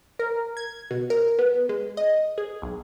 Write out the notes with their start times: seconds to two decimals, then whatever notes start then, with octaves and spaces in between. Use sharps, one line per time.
0.19 A#4
0.57 G#6
0.91 B2
1.10 A#4
1.39 B3
1.69 G#3
1.97 D#5
2.38 G#4
2.62 B1